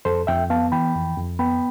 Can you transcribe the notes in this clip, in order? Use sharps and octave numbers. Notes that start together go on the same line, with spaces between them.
F2 A4 C5
F2 E5 G5
B3 F5 A5
E3 G5 B5
F2
F2
B3 G5 B5